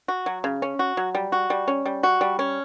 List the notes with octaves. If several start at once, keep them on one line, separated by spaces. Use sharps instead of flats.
F#4
F#3
C#3
C#4
F#4
F#3
G3
F#4
G3
C#4
G3
F#4
G3
C#4